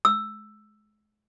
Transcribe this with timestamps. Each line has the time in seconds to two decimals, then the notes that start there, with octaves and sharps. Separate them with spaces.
0.05 E6